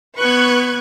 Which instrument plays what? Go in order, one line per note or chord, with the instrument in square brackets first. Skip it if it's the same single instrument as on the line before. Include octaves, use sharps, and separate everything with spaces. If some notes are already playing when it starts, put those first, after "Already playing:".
[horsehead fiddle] B3 B4 [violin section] C#6 F#6 G#6